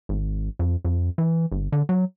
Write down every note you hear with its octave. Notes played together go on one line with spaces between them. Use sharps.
G#1
F2
F2
E3
G1
D3
F#3